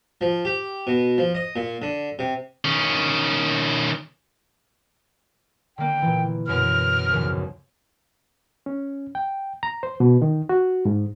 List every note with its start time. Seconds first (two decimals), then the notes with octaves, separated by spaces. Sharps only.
0.21 F3
0.45 G4
0.87 B2
1.18 F3
1.35 D#5
1.56 A#2
1.82 D3
2.19 C3
2.65 D#3 C#4
5.78 D3 A#3 G5
6.02 A#2 E3
6.47 F#2 B2 F6
7.10 A#1 D#2 C#3
8.66 C#4
9.15 G5
9.63 A#5
9.83 C5
10.00 B2
10.22 D#3
10.49 F#4
10.85 G#2